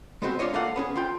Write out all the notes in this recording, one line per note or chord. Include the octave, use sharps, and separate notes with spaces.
G#3 B3 C4 F#4 G4
G#3 D4 F4 C#5 D#5
A3 A#3 A4 F5 F#5
B3 C#4 G#4
D2 F4 G5